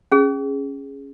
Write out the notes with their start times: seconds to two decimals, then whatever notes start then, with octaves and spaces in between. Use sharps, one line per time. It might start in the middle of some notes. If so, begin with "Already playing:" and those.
0.12 C#4 G#4